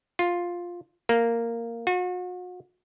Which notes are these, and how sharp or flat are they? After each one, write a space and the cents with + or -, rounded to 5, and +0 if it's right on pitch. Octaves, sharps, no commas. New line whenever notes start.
F4 +5
A#3 -10
F#4 -40